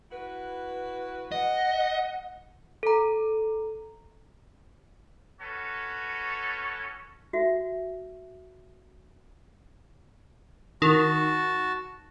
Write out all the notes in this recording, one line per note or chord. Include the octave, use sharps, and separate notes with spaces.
E4 F#4 B4
D#5 F#5
A4 A#5
C#4 F#4 A4 B4 C#5
F#4 E5
D#3 F#4 A5